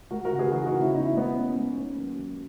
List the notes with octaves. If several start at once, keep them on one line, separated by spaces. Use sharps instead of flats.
G#3 F#4 A#4
F#4 A#4
C#3
G#4 B4
E3 F#4 A#4
D#4 F#4
C#3
C#4 E4
B3 D#4
E4
G#3 B3 D#4
B3 C#4
G#3
A#3 C#4
F#3
F#3